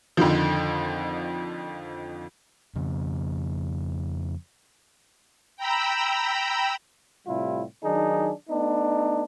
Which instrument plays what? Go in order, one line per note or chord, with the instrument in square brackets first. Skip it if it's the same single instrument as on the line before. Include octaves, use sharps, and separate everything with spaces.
[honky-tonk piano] F2 D3 D#3 F3
[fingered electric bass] F2 C#3
[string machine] G5 A#5 B5 E6
[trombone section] A2 C3 G3 E4 F4
D#3 F#3 D4 D#4 G#4
A3 B3 D4 D#4